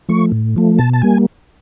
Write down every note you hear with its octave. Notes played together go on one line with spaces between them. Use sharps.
F3 A3 C#6
A2
F3 A3
B2 A5
A5
G3 A#3 G#5